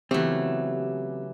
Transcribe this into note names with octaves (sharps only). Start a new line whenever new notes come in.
C#3 E3 F#3 A3 B3 C4 G4